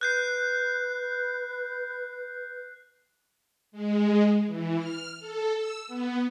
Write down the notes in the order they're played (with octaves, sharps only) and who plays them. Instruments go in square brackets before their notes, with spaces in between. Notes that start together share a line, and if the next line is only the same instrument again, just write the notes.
[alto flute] B4 [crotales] F#6 G6 C7
[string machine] G#3
E3
F6
A4
E6
B3